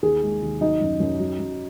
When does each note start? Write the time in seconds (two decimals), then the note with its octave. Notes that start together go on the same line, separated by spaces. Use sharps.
0.02 D#2 G#4
0.22 G#3
0.42 D#2
0.61 F#3 D#4
0.81 F#2
1.00 F#2
1.20 F#3
1.39 F#2